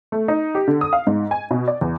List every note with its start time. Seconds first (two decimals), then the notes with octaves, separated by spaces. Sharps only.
0.12 A3
0.28 D#4
0.55 G4
0.67 D3
0.81 D#6
0.93 F5
1.07 G#2
1.31 G#5
1.51 B2
1.68 D5
1.81 E2